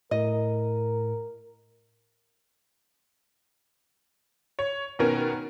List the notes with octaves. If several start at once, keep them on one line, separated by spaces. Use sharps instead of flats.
A2 A#4 D#5
C#5
B2 D#3 B3 C#4 A#4